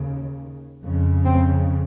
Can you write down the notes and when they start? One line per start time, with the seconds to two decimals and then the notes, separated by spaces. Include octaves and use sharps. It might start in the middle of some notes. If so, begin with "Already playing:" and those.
Already playing: D#2 C#3
0.84 F2 C#3
1.25 C4